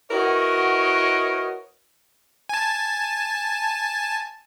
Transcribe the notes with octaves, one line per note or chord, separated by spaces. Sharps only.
E4 F#4 A#4 B4 C#5 D#5
G#5 A5